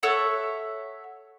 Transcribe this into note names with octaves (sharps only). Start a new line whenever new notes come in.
A4 C#5 E5 F#5